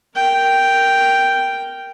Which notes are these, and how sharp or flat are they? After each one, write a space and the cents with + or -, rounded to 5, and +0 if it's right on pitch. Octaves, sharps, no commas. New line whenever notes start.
A#4 +0 G5 +0